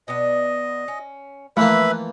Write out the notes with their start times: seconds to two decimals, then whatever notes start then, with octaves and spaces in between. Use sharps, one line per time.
0.08 B2 B3 D4 D#5
0.88 C#4
1.57 E3 F3 A3 A#3 A4 B4 E5 B5